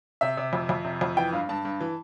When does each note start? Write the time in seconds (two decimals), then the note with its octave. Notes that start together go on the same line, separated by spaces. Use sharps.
0.21 C3 E5
0.37 C3
0.53 F2
0.69 F2
0.85 C3
1.01 F2
1.17 E3 G5
1.33 G2 F5
1.49 G2 A5
1.65 G2
1.80 E3